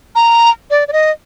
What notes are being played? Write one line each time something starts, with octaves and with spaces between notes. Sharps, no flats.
A#5
D5
D5
D#5